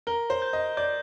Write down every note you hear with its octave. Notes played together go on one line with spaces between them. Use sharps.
A#4 G7
C5
G6
D#5
D5 G6